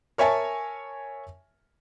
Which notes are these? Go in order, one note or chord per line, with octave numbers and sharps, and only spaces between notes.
A#4 C#5 E5 G#5 A5 C#6